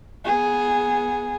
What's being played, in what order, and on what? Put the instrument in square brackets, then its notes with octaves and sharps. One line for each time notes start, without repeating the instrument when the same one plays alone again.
[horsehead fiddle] B3 G#4